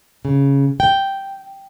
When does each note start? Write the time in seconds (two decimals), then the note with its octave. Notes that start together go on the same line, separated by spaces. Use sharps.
0.25 C#3
0.80 G5